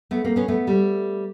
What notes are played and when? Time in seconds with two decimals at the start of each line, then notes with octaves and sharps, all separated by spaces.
0.11 A3 B3
0.25 A#3 C4
0.36 B3 C#4
0.48 A3 B3
0.67 G3 A3